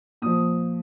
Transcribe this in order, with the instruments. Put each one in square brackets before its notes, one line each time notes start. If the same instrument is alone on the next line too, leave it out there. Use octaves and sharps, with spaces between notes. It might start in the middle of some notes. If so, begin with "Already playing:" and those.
[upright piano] A#2 F3 D#6